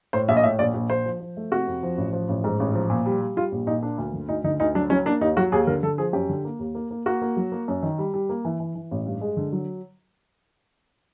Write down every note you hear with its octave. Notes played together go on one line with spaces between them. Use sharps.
A2 C5
A#1 E5
D#5
A2 E5
A#1 D5
A#1
A#1 C5
F3
F3
A3
C3 F#4
F2
F3
A1
F3
A1
G#2
A1
F3
A#2
G3
G3
G3 F4
A#1
A#2 D#4
A#3 D4
D2
D3
D2 D#4
D3 D#4
D2 D#4
F#3 D4
F#3 C#4
A#3 D4
D#2 D#4
F#3 F#4
D#2 G#4
D3 A#4
D3 A4
F3 G#4
F#2 G4
D3
A#3
D#2
A#3
A#3
A#3 F#4
A#3
F#3
A#3
F#2
D#3
G3
G3
A#3
E3
E3
E3
A1
G2
G#3
D3
F#3